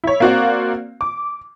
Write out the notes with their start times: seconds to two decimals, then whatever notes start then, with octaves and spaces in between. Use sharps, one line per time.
0.04 E4 C#5
0.20 A#3 C4 F#4 D5 F5
1.01 D6